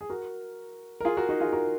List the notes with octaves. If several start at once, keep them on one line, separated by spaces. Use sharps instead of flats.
G#4
F#4 A#4
A#4
F4 G#4
F#4 A#4
D#4 F#4
F4 G#4
F#4 A#4